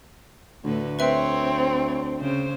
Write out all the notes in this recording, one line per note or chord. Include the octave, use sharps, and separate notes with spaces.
D2 A2 D3 B4
C4 B4 C#5 E5
C#3 C5